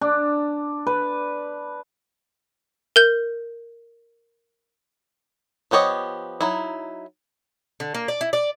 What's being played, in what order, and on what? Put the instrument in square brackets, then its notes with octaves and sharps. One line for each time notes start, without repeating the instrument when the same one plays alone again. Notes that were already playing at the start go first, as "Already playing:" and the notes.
[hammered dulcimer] D4
B4
[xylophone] A#4 G6
[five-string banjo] F3 B3 G4 C#5 D#5
F#3 D#4 E4
[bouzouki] D3
A#3
D5
E4
D5